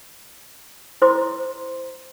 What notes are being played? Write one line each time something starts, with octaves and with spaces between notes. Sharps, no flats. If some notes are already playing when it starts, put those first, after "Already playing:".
E4 C5 C6 D6